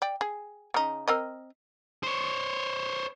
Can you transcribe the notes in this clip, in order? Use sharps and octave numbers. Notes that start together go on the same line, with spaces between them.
D5 G5
G#4
C#3 D#4
C4 A#4 D#5
C5 C#5